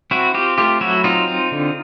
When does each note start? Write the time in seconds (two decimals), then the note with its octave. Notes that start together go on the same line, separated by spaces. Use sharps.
0.11 C4 E4 F#4
0.34 C4 F4 G4
0.58 A3 F4 G4
0.81 F#3 E4 F#4
1.04 C4 D#4 F4
1.28 C4
1.52 D3